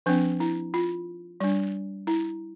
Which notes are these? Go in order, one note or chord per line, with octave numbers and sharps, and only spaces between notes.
F3 C4 D4
E4
F4
G3 D4
E4